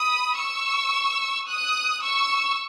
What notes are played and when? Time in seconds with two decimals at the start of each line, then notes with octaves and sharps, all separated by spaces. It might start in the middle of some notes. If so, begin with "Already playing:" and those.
Already playing: B5 D#6
0.39 C#6 E6
1.48 D#6 F#6
2.03 C#6 E6